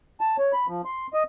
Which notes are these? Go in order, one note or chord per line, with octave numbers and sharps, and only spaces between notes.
A5
C#5
B5
F3
C6
D#5